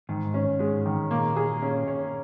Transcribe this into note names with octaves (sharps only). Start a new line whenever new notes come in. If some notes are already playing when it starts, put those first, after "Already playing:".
G#2 D#3
C#4
G#2 G#3
D#3
A#2 A#3
G#4
C#4
C#5